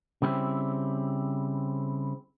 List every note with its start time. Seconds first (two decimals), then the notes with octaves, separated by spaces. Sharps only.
0.22 C#3 G3 C4 E4